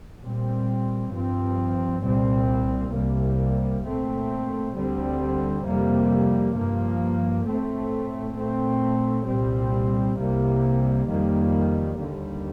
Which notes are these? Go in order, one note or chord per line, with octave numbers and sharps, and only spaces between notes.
A#2 G3 C4
G2 F3 C4
C2 A#2 G3 C4
C2 C3 G3 A#3
A#2 A3 C4
D2 D3 G3 C4
F2 C3 G3 A#3
G2 F3 A#3
A2 A3 C4
A#2 A3 C4
C2 A#2 G3 C4
C2 C3 G3 A#3
F2 D#3 G3 A#3
D#2 D3 G3